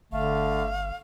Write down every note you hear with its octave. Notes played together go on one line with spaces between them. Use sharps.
G1 D3 A3 F5